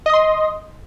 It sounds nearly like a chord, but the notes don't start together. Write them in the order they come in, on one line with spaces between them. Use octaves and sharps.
D#5 D#6 C6